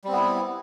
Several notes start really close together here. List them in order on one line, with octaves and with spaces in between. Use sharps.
G3 C4 B3 E4